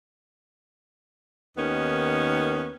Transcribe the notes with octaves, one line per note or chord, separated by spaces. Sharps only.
D#2 D#3 B3 C#4